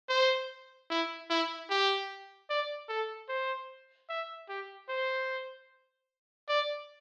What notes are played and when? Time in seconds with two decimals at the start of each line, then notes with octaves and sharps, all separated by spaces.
0.09 C5
0.90 E4
1.30 E4
1.70 G4
2.50 D5
2.89 A4
3.29 C5
4.09 E5
4.49 G4
4.89 C5
6.49 D5